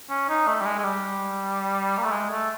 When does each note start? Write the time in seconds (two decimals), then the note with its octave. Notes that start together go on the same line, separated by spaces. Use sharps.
0.10 C#4
0.29 D#4
0.47 A3
0.61 G3
0.66 G#3
0.78 G#3
0.84 G3
1.98 A#3
2.04 A3
2.12 G#3
2.30 A3